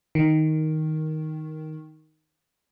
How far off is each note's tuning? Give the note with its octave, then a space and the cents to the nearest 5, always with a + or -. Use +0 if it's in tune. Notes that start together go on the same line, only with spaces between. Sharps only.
D#3 +5